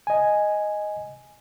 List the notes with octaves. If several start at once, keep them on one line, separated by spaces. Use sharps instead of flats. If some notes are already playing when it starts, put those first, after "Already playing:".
D#5 G#5